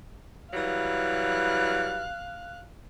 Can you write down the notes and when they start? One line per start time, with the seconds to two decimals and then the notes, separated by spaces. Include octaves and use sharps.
0.54 E3 F#3 G3 F5 F#6